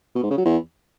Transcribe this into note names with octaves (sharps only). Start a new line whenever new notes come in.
B2
G#2
C#3
F#3
E2